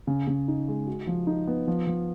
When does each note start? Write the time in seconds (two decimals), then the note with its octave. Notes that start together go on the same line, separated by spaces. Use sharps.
0.07 C#3
0.27 C#3
0.48 D#4
0.68 G#3
0.87 F#4
1.07 F3
1.27 D#4
1.47 B3
1.67 F3
1.87 F3